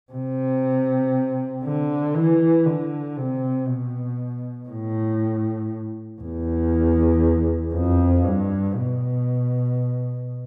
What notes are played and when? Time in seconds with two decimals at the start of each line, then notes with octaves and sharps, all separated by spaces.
0.12 C3
1.63 D3
2.14 E3
2.65 D3
3.17 C3
3.67 B2
4.68 A2
6.21 E2
7.73 F2
8.24 G2
8.74 B2